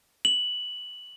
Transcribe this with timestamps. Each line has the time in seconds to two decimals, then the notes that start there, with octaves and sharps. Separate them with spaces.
0.25 F#7